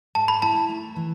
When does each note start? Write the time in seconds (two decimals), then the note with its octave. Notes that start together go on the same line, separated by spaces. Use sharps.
0.15 G#2 A5
0.28 B5
0.42 E4 A5
0.69 A3
0.96 E3